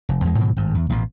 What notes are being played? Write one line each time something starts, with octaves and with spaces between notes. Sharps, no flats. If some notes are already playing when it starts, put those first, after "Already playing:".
F1
E2 G#3
G#2 B2 D#3 F#3
G#1 G2
E2
A1 B2